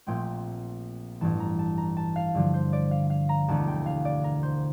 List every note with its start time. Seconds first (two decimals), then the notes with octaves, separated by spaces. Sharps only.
0.07 A#1 A#2 A3 C4 G5
1.21 A1 G2 E3 A5
1.40 A#5
1.59 A5
1.77 A#5
1.97 A5
2.16 F5
2.35 G2 D3 F3
2.54 C5
2.73 D5
2.91 F5
3.10 F5
3.29 A#5
3.48 E1 D2 D3 A3 A5
3.68 G5
3.86 F5
4.05 D5
4.24 A#4
4.43 C5